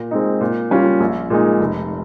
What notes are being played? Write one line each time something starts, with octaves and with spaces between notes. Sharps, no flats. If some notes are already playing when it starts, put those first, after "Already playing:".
Already playing: A#2
G#3 C4 D#4
A#2
G3 C#4 F4
A#1
A#2 G#3 D#4
F1